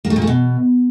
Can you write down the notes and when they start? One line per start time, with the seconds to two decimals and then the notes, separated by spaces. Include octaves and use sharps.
0.05 A#3
0.10 A3
0.16 A#2
0.22 A3
0.27 B2